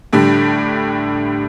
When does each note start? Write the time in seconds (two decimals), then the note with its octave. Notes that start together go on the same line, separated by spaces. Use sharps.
0.13 A2 D3 G3